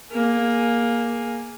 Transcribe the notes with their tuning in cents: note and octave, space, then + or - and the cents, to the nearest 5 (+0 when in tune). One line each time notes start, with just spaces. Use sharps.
A#3 +10 G#4 +0